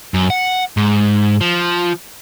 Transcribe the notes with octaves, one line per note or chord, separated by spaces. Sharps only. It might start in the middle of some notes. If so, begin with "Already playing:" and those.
F#2
F#5
G#2
F3